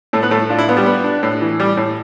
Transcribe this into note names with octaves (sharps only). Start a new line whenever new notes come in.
A2 A3 A4
B3 B4
A2 A3 A4
D4 F4
E4
B3 F4
G3 G4
B3
D4
A2
E3
G3 G4
A2